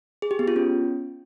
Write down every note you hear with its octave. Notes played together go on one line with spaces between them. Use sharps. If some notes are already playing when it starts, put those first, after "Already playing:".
G#4
G4
B3
F4
C#4